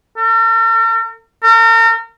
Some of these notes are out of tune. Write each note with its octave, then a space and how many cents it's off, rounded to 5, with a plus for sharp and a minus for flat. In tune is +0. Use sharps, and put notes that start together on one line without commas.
A#4 -45
A#4 -40